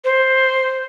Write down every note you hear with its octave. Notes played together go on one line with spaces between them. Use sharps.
C5